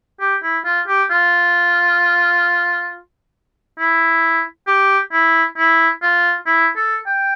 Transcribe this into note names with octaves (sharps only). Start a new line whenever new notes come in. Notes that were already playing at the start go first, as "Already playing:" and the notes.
G4
E4
F4
G4
F4
E4
G4
E4
E4
F4
E4
A4
G5